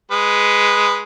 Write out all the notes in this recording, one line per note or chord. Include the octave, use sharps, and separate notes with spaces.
G#3 B4